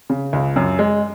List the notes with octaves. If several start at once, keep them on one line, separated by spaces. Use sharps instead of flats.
C#3
C#2
F#2
G#3